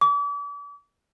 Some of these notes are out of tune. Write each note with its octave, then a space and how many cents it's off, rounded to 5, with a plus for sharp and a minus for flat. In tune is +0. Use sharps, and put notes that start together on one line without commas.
D6 -40